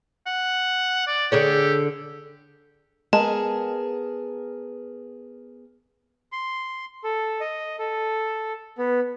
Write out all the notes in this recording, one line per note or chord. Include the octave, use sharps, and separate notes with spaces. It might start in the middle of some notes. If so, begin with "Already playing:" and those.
F#5
D5
D3 G4 G#4 C#5
G#3 B3 G#4 A#4 A5
C6
A4
D#5
A4
B3